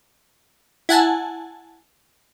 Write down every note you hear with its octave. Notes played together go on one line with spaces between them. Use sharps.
E4 F#5 G#5 A5